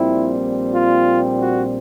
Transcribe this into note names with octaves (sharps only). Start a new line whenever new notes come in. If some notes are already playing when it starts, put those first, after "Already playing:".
Already playing: A#1 A#2 G3 C4 E4
F4
F#4